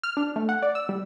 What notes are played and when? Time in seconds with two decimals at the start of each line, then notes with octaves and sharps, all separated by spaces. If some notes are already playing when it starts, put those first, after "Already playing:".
0.04 F6
0.17 D4
0.36 A3
0.49 F#5
0.63 D5
0.75 E6
0.89 G3